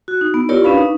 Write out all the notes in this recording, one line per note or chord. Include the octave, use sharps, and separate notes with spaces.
F#4
D#4
B3
E4 F4 G4 A#4 C#5 D5
C#4 D4 B4 F5 B5
D#4